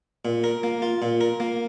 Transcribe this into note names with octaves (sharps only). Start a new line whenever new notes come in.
A#2
A#4
A#3
F4
A#2
A#4
A#3